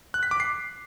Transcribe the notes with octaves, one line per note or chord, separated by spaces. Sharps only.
F#6
B6
D6
C7